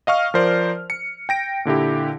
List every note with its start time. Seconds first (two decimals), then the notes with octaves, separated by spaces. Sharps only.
0.07 D#5 F5 C#6 F6
0.34 F3 A#4 C5 D5
0.90 C#7
1.29 G5 A#6 D7
1.65 A#2 D3 E4 G4